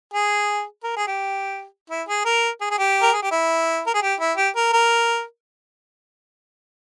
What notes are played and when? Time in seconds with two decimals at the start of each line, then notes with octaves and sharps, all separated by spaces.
0.14 G#4
0.84 A#4
0.96 G#4
1.07 G4
1.90 E4
2.08 G#4
2.25 A#4
2.61 G#4
2.71 G#4
2.78 G4
3.02 A#4
3.12 G#4
3.22 G4
3.31 E4
3.87 A#4
3.94 G#4
4.02 G4
4.20 E4
4.37 G4
4.56 A#4
4.73 A#4